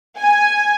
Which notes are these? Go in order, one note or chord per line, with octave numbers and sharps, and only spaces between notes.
G#5